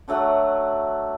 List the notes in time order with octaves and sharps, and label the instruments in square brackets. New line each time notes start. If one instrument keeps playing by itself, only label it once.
[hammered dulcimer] D3 F#3 A3 F#5